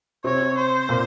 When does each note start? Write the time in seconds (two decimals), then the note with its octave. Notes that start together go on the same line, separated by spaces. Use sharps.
0.24 C3 C4 C#5
0.57 C5
0.89 A#2 A#3